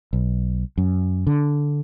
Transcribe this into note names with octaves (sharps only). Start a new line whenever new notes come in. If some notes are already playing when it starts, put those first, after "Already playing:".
B1
F#2
D3